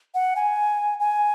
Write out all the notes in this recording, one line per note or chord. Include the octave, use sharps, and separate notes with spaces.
F#5
G#5
G#5